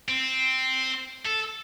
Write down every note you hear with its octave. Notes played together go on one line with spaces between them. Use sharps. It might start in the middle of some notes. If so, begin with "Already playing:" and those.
C4
A4